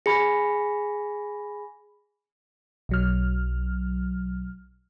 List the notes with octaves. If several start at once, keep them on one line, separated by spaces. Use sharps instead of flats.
G#4 G#5 B5 A#6
B1 F#3 F6